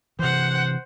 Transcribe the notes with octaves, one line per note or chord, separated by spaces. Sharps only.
C3 E3 C5 F#5